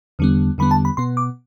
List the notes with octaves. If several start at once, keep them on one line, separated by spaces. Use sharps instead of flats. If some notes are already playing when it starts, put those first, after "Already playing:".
E2 D3 G3 B3
E2 D3 G3 B3 B5
A5
B5
B2 B3 C6
D6